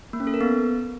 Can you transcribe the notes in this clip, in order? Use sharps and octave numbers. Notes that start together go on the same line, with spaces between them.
A#3
C#4
A4
A#4
B3